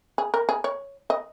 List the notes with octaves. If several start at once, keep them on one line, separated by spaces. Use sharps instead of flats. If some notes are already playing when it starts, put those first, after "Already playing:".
G#4
A#4
G#4
C#5
D#5